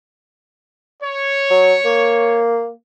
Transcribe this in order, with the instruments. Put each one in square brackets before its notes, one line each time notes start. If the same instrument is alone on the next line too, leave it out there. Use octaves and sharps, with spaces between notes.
[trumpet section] C#5
[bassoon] F#3
A#3